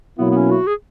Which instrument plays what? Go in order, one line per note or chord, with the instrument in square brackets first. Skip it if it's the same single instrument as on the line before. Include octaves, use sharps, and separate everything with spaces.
[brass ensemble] B2 F#3 A#3 E4 [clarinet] B3
[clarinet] B3
C#4
F#4
G#4